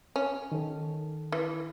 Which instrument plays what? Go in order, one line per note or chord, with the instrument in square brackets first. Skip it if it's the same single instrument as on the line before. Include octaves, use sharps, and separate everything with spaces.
[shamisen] C#4
[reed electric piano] D#3 A4
[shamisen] E3